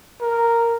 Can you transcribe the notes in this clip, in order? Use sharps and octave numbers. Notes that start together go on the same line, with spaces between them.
A#4